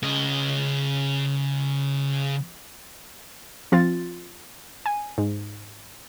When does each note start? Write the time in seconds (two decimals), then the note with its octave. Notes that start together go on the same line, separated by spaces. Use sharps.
0.03 C#3 D#5
3.72 F3 C4 F4 A6
4.86 G#5
5.18 G#2